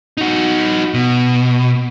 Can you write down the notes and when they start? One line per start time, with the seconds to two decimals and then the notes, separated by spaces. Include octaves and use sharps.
0.17 D#4 F#4
0.94 B2